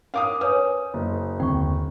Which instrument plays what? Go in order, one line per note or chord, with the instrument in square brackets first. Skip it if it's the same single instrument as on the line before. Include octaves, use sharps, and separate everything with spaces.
[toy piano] C#4 A#4 [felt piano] F5 D6 D#6
[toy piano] B4 C#5 G#5 [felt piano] D#6
[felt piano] F#1
[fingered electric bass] D#2 D3 C4 [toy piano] G5 C#6